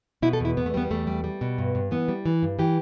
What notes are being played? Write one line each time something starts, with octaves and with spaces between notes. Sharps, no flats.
B2 E4
A4
E2 E4
E2 B3
A3
G3 B3
E2 A3
G3
G3
B2
G2
G2
E3 B3
G3
E3
G2
E3 G4